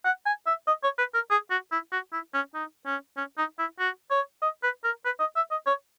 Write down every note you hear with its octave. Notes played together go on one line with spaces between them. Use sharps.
F#5
G#5
E5
D#5
C#5
B4
A#4
G#4
F#4
E4
F#4
E4
C#4
D#4
C#4
C#4
D#4
E4
F#4
C#5
D#5
B4
A#4
B4
D#5
E5
D#5
C#5